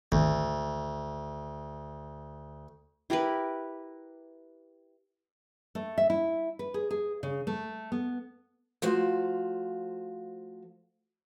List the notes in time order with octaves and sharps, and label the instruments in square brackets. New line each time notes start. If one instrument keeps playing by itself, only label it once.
[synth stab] G#1 [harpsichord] D2
[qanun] E4 G4 A#4 B4
[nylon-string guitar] A3
E5
E4
B4
G#4
G#4
C#3
A3
B3
[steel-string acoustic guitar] F3 A3 F#4 C5 F5